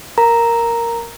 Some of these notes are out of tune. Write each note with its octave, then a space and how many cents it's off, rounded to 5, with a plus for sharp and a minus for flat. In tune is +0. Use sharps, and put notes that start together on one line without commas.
A#4 +0 A#5 +0